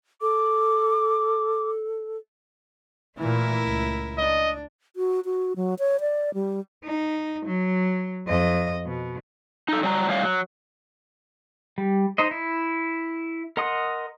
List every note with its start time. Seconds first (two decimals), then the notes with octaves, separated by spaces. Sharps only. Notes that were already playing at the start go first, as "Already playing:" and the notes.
0.21 A4 D6
3.18 A#2 E3 A3 E4 A#4
3.63 C#2
4.18 D4 D#5
4.96 F#4
5.25 F#4
5.56 F#3
5.79 C#5
6.00 D5
6.34 G3
6.84 D#4
7.45 F#3
8.27 F2 D#5
8.86 B2
9.68 D#4 A4
9.83 F#3 G3 G#5 A#5
10.08 A2 G3 G#3 C#5 F5
10.23 F#3
11.78 G3
12.18 D#4 C5 D#5
12.31 E4
13.57 A#4 D#5 F#5 C6 D#6